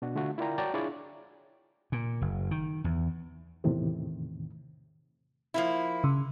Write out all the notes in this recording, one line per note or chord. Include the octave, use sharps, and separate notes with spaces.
B2 D4 F#4
D3 A3 F4 F#4
E4 F4 A#4 D5 G5 A#5
F#4 C#5 D5 G5 A5 A#5
D4 E4 F4 G#4 C#5 D5
A#2
F#1
D#3
E2
E2 A2 C3 D#3
F3 A#3 E4
C#3